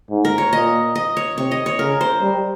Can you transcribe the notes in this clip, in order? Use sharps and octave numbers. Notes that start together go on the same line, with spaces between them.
G#2
A#4
C#5
A#2 D#5
D#5
C#5
C3 C#5
D#5
C#5
C#3 A#4
C5
G3